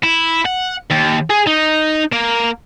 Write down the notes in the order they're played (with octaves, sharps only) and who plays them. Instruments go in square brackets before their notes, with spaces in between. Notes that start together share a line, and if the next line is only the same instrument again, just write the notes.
[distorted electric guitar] E4
F#5
D#2
G#4
D#4
A#3